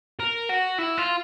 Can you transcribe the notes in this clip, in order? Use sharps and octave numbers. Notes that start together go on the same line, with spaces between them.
A#4
F#4
E4
F4